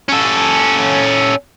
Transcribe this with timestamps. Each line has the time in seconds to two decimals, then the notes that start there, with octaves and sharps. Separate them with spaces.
0.09 C#4 A4